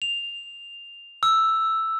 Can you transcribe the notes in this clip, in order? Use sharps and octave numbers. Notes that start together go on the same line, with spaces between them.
F7
E6